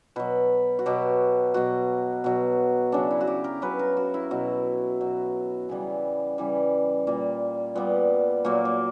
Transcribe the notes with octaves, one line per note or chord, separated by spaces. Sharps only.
B2 F#3 B4
F#4
B2 F#3 G4
B2 F#3 F#4
B2 F#3
C#3 F#3 D4
E4
F#4
G4
A#4
C#3 F#3 B4
A#4
F#4
E4
B2 F#3
B2 F#3
C#3 E3 G3 B3
C#3 E3 G3
A#2 G3 A#3
A#2 G3 B3
A#2 F#3 A#3
A#3